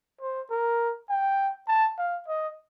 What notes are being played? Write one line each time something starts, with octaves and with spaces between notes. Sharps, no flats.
C5
A#4
G5
A5
F5
D#5